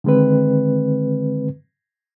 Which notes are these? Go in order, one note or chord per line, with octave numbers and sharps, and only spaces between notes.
D3 D#3 G#3 C4 B4